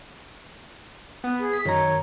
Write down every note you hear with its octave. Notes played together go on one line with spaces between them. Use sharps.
B3
G#4
B6
F#2 D#3 C#5 A#5